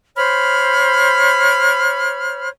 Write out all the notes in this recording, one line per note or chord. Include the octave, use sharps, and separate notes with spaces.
C5 C#5 B5 F6